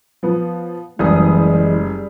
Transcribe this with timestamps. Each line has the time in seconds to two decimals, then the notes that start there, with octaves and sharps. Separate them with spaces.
0.23 F3 B3
0.99 F#1 E3 G3 G#3 D#6